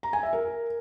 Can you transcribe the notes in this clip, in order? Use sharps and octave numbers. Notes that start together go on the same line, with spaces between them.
A#5
G#5
E5
A#4